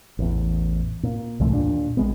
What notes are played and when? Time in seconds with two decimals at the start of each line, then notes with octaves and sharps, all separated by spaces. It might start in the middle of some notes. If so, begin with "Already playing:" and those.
0.19 A1 E2
1.03 A#2
1.40 C2 G#2 E3 A3
1.53 D#2 A#2 D4
1.97 A#1 G#3 B3